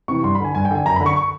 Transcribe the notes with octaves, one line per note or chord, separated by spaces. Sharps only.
C3 E3 C#6
G2 C6
B5
D3 G#5
G2 G#5
G5
D3 G#5
F#2 A#5
B5
D3
C#6
C#6